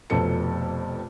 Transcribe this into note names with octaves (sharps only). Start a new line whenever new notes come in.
F1 F2 B2 A4 C#7